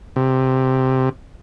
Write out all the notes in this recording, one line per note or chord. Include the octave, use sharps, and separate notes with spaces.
C3